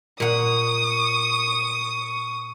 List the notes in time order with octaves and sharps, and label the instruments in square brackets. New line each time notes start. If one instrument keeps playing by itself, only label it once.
[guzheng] A#2 F#5 [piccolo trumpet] C#6 [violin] D#6